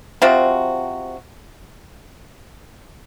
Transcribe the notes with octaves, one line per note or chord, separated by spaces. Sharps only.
C3 F3 C4 F#4